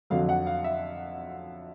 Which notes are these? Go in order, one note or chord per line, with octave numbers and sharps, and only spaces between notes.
F2 D3 F#3 F5
F#5
F5
E5